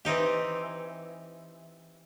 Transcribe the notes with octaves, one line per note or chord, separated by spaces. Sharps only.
E3 C4 D#4 G4